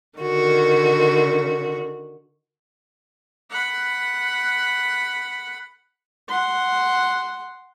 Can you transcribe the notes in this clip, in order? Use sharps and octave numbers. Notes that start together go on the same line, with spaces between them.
D3 D#3 F#4
F#5 B5
F#5 C6